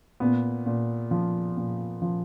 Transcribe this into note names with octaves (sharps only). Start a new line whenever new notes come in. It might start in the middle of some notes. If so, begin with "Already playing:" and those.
A#2 B3
A#2
F3
A#2
F3